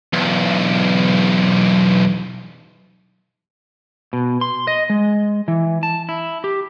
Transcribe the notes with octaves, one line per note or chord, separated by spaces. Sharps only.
B1 E2
B2
C6
D#5
G#3
E3
A5
E4
G4